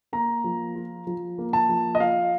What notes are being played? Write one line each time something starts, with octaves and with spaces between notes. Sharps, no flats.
A#3 A#5
F3
F4
F3
A#3
A5
F3
D#5
F4 F5